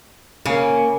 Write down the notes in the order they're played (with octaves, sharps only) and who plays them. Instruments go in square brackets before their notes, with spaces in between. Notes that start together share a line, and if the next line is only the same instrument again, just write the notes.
[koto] C#3 [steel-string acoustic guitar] A#3